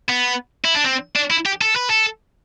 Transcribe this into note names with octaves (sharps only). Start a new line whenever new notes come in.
B3
E4
D4
C4
D4
E4
G4
A4
B4
A4